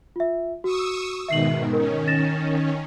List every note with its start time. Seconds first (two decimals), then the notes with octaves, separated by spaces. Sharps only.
0.16 F4 E5
0.64 F#4 C#6 D#6 E6
1.28 G#2 B2 D#3 E5 C7 F#7
1.73 D#3 C#4 A#4
2.08 A6 A#6 E7